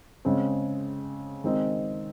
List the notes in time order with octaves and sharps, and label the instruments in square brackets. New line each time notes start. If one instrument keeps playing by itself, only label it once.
[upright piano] C#3 G#3 C4
D#3 G#3 C4 D#4